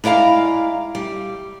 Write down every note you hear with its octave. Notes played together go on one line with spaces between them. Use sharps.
G#3 E4 D5 F5 A#5
G3